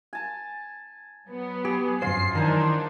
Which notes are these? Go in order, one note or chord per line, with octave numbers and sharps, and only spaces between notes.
G#5 A5
F#3 B3
G4 G#4
G1 F#2 C3 F4 C5 C7
D#3 E3 F#3 D4 D#4 A#4 C5 G#5